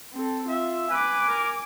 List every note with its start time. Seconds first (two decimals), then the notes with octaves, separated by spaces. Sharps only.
0.13 C4 A4
0.48 F4 E5
0.91 B4 G#5 D6
1.28 A#4